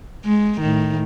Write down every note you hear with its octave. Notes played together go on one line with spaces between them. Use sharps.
G#3
A2 D#3